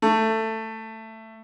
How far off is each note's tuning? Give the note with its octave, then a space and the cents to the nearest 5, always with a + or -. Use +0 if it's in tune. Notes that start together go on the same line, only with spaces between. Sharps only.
A3 +15